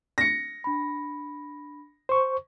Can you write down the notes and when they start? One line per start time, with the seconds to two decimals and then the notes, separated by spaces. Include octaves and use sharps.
0.18 A#6 C#7
0.64 D4 B5
2.09 C5 C#6